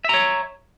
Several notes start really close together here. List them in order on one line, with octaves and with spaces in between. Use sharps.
E5 A#5 C#5